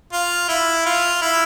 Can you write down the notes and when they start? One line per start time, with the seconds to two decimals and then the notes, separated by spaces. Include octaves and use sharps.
0.13 F4
0.48 E4
0.86 F4
1.22 E4